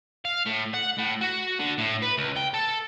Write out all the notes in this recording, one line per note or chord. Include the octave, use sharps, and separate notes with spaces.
F5
A2
F#5
A2
F#4
D3
A2
B4
C#2
G5
A4